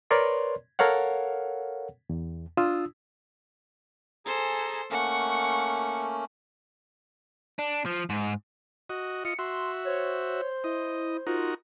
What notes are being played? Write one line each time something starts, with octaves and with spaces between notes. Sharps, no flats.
A#4 B4 C#5 D5 C6
A4 A#4 C#5 F5 F#5
E2
D4 F4 D#6 E6
G#4 A4 C5 G#5 A#5
A3 A#3 C#4 F#5 C#6
D4
F3
G#2
F#4 D#5
F4 D#5 C#7
F#4 E5 C6
C5 C#5
E4 D#5
D#4 F4 F#4 A#4